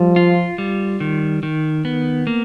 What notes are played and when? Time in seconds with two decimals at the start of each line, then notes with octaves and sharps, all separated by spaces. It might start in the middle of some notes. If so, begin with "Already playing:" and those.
Already playing: F3 G3
0.16 F4
0.58 G3
1.00 D#3
1.43 D#3
1.85 B3
2.27 A#3